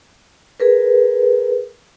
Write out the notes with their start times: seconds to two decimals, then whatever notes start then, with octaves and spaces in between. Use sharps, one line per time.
0.60 G#4 A#4 B4